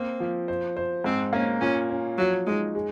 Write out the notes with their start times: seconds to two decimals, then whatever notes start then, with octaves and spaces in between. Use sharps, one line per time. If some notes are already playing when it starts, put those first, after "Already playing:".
Already playing: A#3 C4
0.20 F3
0.48 C5
0.77 C5
1.04 G#2 C4
1.33 A#3 C#4
1.61 A#2 C#4
1.90 C#4
2.18 F3 F#3
2.46 G#3 D#4
2.75 G#3